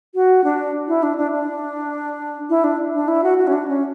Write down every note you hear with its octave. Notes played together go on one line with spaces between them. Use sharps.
F#4
D4
E4
D4
D4
D4
E4
D4
D4
E4
F#4
F#4
C#4
D4
C#4